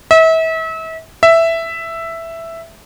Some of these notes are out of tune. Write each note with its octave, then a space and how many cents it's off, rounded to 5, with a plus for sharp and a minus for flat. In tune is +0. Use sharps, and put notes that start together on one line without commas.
E5 -35
E5 +5